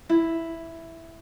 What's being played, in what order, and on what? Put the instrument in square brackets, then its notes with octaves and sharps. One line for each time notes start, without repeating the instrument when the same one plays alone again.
[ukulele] E4